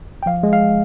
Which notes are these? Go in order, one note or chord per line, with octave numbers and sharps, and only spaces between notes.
G5
F3 F5
G#3
F5